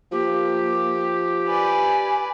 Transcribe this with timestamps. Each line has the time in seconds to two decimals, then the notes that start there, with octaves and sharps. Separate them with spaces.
0.12 F3 A#3 G4
1.47 B4 D5 G#5